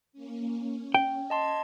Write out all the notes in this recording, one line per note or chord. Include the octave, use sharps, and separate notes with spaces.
A#3 C#4
C#4
G5
D#5 A5 C6 G#6